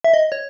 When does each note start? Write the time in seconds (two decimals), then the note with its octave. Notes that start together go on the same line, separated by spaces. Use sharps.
0.04 E5
0.14 D#5
0.32 C#5